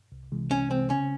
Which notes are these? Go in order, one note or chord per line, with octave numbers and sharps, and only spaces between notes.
C2
C3 E3 G#3
C2 C#4
C3 E3 G#3 C4
C#3 C#4